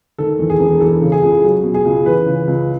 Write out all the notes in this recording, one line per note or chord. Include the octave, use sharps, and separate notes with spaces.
D#3 A4
E2
G#4
E1
E3 A4
C#3
G#4
C#2
F#3
B2
G#4
C#2
E3 B4
C#3
C#2